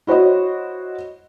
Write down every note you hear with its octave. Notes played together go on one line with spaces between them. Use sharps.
E4 F#4 C5 C#5 D#5